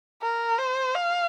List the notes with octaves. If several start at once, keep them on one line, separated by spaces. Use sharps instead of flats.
A#4
C5
F5